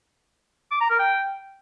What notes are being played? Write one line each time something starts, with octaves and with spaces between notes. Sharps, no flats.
D6
A#5
A#4
G5